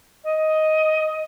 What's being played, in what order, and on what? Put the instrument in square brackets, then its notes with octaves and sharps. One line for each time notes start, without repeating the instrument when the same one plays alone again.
[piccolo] D#5